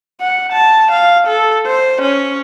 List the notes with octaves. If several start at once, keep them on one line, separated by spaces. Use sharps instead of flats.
F#5
A5
F5
A4
C5
C#4